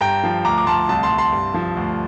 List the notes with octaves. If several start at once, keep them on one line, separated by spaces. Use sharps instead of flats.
G2 G5 A#5
F3
D2 A#5 D6
D6
D2 A5 C6
C2 A5
A5 C6
C2
A5 C6
G2
F3
D2